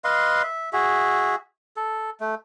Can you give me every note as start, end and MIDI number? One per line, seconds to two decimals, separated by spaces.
0.04 0.42 71
0.04 0.42 75
0.04 0.42 77
0.04 0.42 84
0.43 0.70 76
0.73 1.35 66
0.73 1.35 68
0.73 1.35 76
1.76 2.10 69
2.20 2.35 57